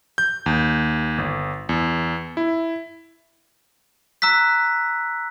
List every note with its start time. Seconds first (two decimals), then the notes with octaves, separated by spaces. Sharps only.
0.18 G6
0.46 D#2
1.18 G1
1.69 E2
2.37 E4
4.22 A#5 E6 F#6 B6